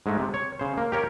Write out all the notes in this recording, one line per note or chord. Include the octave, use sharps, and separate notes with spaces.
G#2 G#3 A3
C3
C#5
C#3 C5
A#3
G4 A#4 C#5